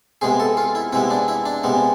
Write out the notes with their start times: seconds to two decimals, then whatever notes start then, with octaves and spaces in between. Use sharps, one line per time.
0.21 C3 G#3 B3 G#4
0.40 A4
0.57 F4
0.75 E4
0.92 C3 G#3 B3 E4
1.11 D4
1.28 E4
1.46 D4
1.64 C3 G#3 B3